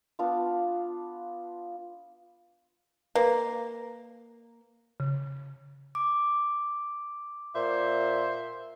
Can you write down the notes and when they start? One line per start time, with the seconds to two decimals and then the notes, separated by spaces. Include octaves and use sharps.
0.19 B3 D4 F4
3.15 A#3 B4
5.00 C#3
5.95 D6
7.55 A#2 C5 E5